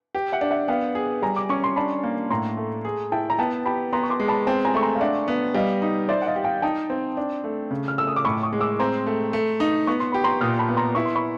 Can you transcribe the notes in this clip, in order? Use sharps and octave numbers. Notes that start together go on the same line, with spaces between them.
G4
E5 F#5
D4
E5 F#5
B3 F5 G5
G#4
G3 G#5 A#5
D6
C#4 C#6
C6
D4 A5 B5
A#3
A2 A#5 C6
A3
G#4
E4 G5 A5
A#5
B3 G5 A5
G4 A5 B5
B3 A#5 C6
C#6
C6 D6
G#3
A5 B5
C4 G5 A5
G#5 A#5
A3 C#6
A#5 C6
F5
D4 E5 F#5
B3
G3 D#5 F5
D#4
C5 D5 E5
F#5
D#5 F5
G4
F5 G5
D#4 G5 A5
C4
D4
A3
C#3
F6
A3 E6
D#6
D6
A2 B5 C#6
C#6 D#6
G#3
D6 E6
C4 A#5 C6
A3
A3
D#4
B3 C#6
C6
G4 B5
A#5 C6
A#2 D#6 F6
A5 B5
B3
A#5 C6
E4 C#6
C6
B5 C#6